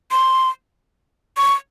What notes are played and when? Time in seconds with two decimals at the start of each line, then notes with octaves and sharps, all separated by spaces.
0.11 C6
1.37 C#6